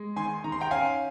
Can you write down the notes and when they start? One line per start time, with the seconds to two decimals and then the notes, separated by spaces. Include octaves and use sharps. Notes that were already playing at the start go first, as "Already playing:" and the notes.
Already playing: G#3
0.16 D#3 G#5 C6
0.44 D#3 A#5
0.52 C6
0.61 G5 A#5
0.71 C#4 F5 G#5